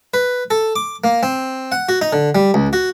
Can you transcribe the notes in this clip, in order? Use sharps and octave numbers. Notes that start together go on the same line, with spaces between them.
B4
A4
D6
A#3
C4
F#5
F#4
D#4
D3
G3
C#2
F#4